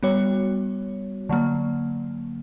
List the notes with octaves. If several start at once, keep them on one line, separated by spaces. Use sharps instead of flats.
G3 B3 F#4 C#5
D3 F#3 A#3